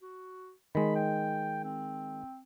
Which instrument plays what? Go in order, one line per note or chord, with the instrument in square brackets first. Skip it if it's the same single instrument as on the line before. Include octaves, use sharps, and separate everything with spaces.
[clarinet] F#4
[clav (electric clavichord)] D#3 G#3 [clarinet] B5
[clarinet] G5
C4